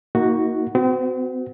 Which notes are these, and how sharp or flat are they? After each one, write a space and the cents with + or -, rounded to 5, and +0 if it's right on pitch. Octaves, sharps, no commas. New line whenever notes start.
A#3 +0 D#4 +35 F#4 +0
C4 -40 F#4 +0